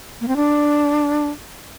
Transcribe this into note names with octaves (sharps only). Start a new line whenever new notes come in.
A#3
C4
D4